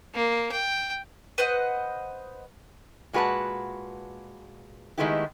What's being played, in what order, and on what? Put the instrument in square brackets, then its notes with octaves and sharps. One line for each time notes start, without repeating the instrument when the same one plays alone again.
[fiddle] A#3
G5
[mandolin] B4 C5 D#5 F#5
[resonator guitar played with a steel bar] A#2 G#3 F#4 B4 F#5 A5
D#3 G#3 A3 B3 E4 G4